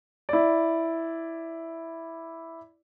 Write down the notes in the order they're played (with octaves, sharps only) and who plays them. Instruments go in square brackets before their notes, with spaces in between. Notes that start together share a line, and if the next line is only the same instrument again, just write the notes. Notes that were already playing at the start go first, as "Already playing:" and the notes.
[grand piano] E4 D5